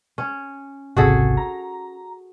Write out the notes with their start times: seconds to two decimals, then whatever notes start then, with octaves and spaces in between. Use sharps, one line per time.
0.18 C#4
0.97 G#1 C#2 C3 F#4 G#4 A4
1.37 A#5